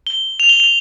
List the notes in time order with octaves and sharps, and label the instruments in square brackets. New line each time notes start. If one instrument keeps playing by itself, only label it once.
[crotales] G7
F7
G7
F7